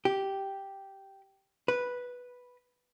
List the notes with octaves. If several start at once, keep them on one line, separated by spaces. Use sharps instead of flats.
G4
B4